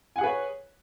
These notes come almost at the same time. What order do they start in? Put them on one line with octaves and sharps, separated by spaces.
G#5 F#5 G#4 B4 C#5